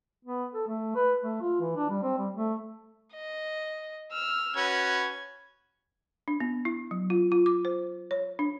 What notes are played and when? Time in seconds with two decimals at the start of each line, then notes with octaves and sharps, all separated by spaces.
0.25 B3
0.53 A4
0.67 A3
0.95 B4
1.22 A3
1.41 F4
1.60 E3
1.76 D4
1.90 G3
2.03 C4
2.18 G3
2.33 A3
3.14 D#5
4.12 E6 F6
4.56 C#4 F#4 B4 G#6
6.28 D4
6.40 B3
6.65 E4
6.91 F#3
7.10 F4
7.32 F4
7.46 D6
7.65 C5
8.11 C#5
8.39 D4